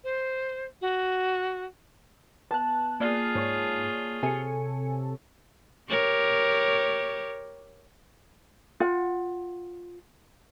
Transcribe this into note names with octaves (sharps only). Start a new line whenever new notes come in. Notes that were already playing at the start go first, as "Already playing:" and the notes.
C5
F#4
B3 A5 F#6
A#3 F4 G#4 D5 F6
G#2 C#5
C3 A4 G#5 C#7
G4 A#4 C#5
F4 F#5